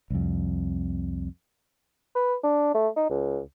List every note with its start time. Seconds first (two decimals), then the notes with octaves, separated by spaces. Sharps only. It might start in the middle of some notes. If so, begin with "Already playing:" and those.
0.10 C2 F2
2.16 B4
2.44 D4
2.75 A3
2.96 D#4
3.10 C#2